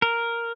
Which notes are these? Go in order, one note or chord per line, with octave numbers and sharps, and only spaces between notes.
A#4